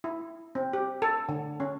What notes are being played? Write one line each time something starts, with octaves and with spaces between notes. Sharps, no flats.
E4
C4
G4
A4
D3
C#4